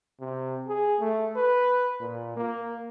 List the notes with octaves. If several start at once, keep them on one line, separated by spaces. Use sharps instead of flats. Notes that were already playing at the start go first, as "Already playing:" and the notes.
C3
G#4
A3
B4
A#2
A#3